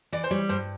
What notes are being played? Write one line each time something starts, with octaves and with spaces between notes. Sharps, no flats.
E3 D5
C5
G3 C#5
G2 C5